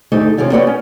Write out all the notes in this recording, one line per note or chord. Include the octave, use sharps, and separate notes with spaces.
D2 G#2 A3 D#4 G4
D#2 C3 F3 C4 C#4
B3 F#4 B4 C#5 D5 G5
C#4